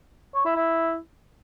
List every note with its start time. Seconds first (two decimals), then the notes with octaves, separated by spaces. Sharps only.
0.34 C#5
0.45 E4
0.56 E4